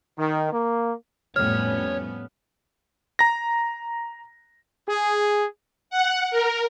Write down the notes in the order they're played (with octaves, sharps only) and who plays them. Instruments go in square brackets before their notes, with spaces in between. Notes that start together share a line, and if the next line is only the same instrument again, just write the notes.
[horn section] D#3
A#3
[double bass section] F2 A2 G3 [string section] A3 B3 C#4 [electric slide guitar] C#5 [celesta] F6
[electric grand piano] A#5 A#6
[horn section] G#4
[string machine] F#5
A#4